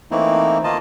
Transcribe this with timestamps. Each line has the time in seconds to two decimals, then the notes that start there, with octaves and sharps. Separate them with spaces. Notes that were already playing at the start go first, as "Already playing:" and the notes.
0.11 E3 A3 A#3 C4 D#4 E4
0.64 D#3 A#3 F4 D#5 A5